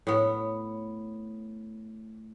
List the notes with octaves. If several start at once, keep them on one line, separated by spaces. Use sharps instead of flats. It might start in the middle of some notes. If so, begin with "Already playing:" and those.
A2 B3